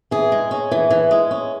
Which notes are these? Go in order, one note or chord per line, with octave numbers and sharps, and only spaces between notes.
E3 G#4
G#3
C#4
E3
E3
G#3
C#4